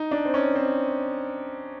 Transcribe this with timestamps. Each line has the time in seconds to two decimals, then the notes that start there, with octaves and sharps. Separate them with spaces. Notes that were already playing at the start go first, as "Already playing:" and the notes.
Already playing: D#4
0.11 D4
0.25 C4
0.34 C#4
0.56 C4